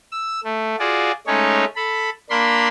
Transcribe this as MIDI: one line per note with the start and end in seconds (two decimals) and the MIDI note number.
0.12 0.40 88
0.44 0.75 57
0.79 1.12 65
0.79 1.12 66
0.79 1.12 68
0.79 1.12 74
1.27 1.65 56
1.27 1.65 57
1.27 1.65 61
1.27 1.65 63
1.27 1.65 73
1.76 2.10 69
1.76 2.10 83
2.30 2.68 58
2.30 2.68 62
2.30 2.68 70
2.30 2.68 83
2.30 2.68 84